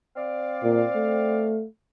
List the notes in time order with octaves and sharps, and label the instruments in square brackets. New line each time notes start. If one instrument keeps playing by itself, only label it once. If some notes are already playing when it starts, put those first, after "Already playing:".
[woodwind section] C4 D5 F5
[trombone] A#2
A3